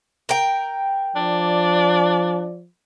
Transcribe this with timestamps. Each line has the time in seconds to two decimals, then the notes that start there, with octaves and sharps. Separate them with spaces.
0.29 A#4 G5
1.16 F3 D4 D5